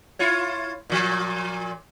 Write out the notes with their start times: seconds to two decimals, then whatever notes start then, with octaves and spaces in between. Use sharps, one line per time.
0.19 E4 F4 C#5
0.90 A#2 F3